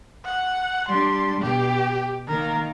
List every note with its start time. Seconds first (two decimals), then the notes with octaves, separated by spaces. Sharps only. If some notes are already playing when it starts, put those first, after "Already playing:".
0.25 F#5
0.88 G3 D4 C6
1.42 B2 G4
2.28 D#3 A#3 A#4